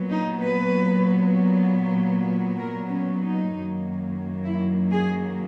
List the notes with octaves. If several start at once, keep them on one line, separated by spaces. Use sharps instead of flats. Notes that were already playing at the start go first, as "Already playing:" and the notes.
Already playing: A#2 F#3 B3
D#4
B4
A#4
C#4
D#4
F#2 D#3 F#3 A#3
E4
G#4